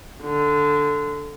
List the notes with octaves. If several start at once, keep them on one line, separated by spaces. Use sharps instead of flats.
D3